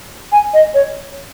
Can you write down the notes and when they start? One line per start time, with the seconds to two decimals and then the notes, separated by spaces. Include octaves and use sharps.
0.32 G#5
0.54 D#5
0.74 C#5